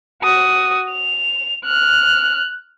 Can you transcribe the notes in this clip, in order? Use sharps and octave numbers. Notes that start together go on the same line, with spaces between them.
F#4 D#6
F7
F6 F#6